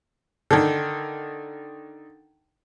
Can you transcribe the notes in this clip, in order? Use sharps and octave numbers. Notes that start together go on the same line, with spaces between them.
D3 D#3